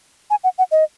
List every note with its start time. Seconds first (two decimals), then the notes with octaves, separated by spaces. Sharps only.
0.30 G#5
0.44 F#5
0.58 F#5
0.71 D#5